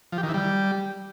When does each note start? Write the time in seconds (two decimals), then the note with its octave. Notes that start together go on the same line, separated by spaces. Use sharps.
0.12 F3
0.18 G4
0.23 D#3
0.29 E3
0.34 G3